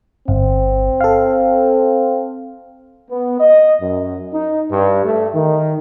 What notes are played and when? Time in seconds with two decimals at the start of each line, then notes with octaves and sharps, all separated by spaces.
0.28 G1 C4
1.01 A4 F5
3.10 B3
3.40 D#5
3.82 F#2
4.32 D#4
4.71 G2
5.05 A3
5.35 D#3